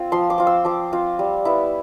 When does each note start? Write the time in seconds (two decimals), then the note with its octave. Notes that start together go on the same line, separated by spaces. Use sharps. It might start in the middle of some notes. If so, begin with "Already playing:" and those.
Already playing: C4 F4
0.12 F3 C6
0.30 D6
0.38 C4 F4
0.47 E6
0.65 F3 D6
0.93 C4 F4
1.19 G3
1.45 B3 E4